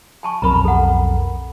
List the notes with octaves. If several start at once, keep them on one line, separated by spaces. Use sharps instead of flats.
G#5 A5 C#6
B1 F2 A#4 A#5 B5
A4 F#5